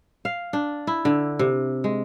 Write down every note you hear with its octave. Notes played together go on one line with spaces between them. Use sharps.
F5
D4
E4
D3
C3
G#3